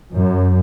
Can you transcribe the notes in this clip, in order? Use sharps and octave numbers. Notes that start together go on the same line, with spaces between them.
F#2